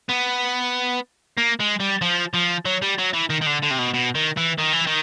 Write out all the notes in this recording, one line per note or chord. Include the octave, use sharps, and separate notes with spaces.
B3
A#3
G#3
G3
F3
F3
F#3
G3
F#3
E3
D#3
D#3
D3
D3
C3
B2
B2
D#3
E3
D#3
E3
D#3